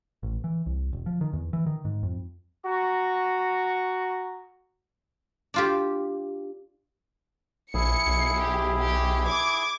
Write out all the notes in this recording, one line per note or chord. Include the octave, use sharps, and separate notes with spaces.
A1
E3
C2
E1
F3
D#3
E2
E3
D#3
G#2
F2
F#4 A#5 C#6
D4 F4 G4
A#1 E4 G#4 C#7
B1
G4
G4
D6 G#6